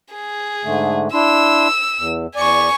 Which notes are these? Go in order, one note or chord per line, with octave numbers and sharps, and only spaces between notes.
G#4
G#2 D3 A3
D4 E4 C6 E6
E2
E2 D5 G#5 C#6